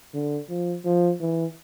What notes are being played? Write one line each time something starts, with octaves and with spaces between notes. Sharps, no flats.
D3
F3
F3
E3